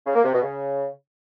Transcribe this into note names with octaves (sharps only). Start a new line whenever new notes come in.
C#3
A#3
C3
B2
C#3